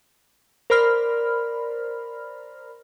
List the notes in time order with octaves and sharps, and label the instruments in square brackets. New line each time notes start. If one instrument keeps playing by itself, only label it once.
[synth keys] A#4 C5 D5 B5 F6